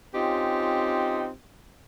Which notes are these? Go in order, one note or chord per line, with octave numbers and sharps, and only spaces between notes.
C4 C#4 D#4 F4 G4